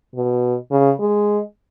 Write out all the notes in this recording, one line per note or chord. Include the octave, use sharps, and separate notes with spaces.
B2
C#3
G#3